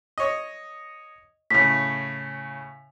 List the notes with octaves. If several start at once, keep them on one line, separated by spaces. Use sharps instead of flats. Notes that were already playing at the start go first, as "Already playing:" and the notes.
C#5 D#5
A2 C#3 B6